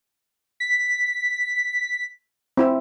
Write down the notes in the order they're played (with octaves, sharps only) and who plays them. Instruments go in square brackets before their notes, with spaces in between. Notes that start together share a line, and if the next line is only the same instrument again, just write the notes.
[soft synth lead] B6
[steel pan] C4 E4 E5